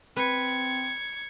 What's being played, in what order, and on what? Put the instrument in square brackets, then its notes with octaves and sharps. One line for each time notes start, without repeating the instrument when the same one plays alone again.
[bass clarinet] C4 [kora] B4 [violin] G#6 C#7